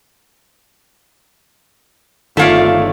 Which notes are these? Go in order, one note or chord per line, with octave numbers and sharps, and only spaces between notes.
G1 D#3 A3 F4 C#5 D5 E5 F5